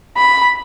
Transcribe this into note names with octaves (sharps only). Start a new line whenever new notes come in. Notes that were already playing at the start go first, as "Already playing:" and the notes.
B5